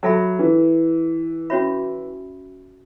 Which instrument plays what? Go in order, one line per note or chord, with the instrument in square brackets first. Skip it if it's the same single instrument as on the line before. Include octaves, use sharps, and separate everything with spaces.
[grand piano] F#3 [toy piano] A4 E5 B5
[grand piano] E3
[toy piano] C#4 F#4 C#5 E5 B5